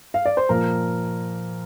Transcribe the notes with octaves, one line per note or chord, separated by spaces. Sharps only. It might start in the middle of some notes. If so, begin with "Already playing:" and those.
F5
D5
C5
A#2 F3 A#3 A#4